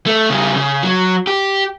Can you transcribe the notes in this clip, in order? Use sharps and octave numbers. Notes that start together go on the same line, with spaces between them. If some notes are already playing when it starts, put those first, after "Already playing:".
A3
C#3 G3
C#3
F#3
G4